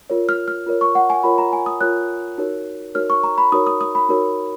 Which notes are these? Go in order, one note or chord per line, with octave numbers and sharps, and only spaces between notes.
F4 A#4 C#5
F6
F6
F4 A#4 C#5
C#6
F#5
G#5
F4 A#4 C#5 B5
A#5
G#5
D#6
F4 A#4 C#5 F#6
D#4 F#4 A#4 C#5
D#4 F#4 A#4 C#5 F6
C#6
A#5
B5
D#4 F#4 A#4 C#5 D#6
D#6
D#6
B5
D#4 F#4 A#4 C#5